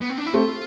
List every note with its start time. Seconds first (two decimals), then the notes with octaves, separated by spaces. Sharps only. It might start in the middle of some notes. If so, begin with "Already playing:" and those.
0.01 B3
0.10 C4
0.18 D4
0.26 E4
0.34 A3 C4 F4